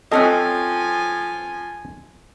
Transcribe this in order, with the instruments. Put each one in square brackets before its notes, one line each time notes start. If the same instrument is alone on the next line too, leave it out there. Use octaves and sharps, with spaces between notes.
[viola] F3 G#5 [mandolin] C4 C#4 F#6 [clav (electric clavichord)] A4 D#5